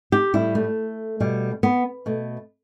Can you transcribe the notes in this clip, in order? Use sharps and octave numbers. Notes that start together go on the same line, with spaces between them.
G4
A2 G3 E4
A3
B2 G3
B3
B2 A3